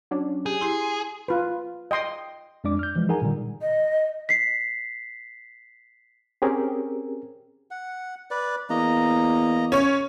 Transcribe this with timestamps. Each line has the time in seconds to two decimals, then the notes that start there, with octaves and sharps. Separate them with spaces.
0.11 F#3 C#4 D4
0.46 G4 G#4
0.61 E4 G4 C6 C7
1.28 F4 B4
1.91 D#5 G5 C6 D#6
2.64 F2 G#3 D4 D5 D6
2.79 F6 G6
2.96 E3 F3 G#3
3.09 D#4 G#4 A#4 F#5 G#5 A#5
3.22 A#2 D3 D#3 G3
3.62 D#5
4.29 B6 C7
6.42 C4 C#4 G4 G#4 A#4
7.71 F#5
8.31 B4 D5
8.70 E2 A#3 D#5 A#5
9.72 C#4 C#5